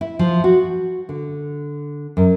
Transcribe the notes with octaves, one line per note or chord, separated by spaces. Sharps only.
E4
F3
F#4
D3
F#2